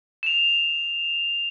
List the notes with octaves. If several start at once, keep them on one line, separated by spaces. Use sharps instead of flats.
E7 F7